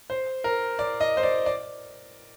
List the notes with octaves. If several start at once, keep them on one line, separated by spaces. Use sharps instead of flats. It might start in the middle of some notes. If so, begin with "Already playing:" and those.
C5
A#4
D5
D#5
C5
D5
D5